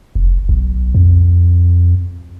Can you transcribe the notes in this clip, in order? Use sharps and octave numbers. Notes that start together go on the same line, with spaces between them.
F1
B1
F2